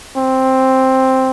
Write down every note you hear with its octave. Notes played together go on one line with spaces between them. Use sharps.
C4